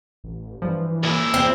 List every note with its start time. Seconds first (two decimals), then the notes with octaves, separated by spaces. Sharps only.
0.24 A1
0.62 G2 E3 F3
1.03 A#2 E4
1.34 E2 C4